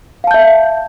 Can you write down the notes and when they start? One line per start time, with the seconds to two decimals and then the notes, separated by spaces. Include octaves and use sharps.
0.24 F5
0.27 A5
0.31 G6
0.34 E5